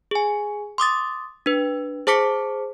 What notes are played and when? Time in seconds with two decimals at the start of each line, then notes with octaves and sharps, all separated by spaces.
0.11 G#4 G#5
0.78 C6 D6 D#6 A6
1.46 D4 B4
2.07 G#4 C5 A5 D6 B6 C#7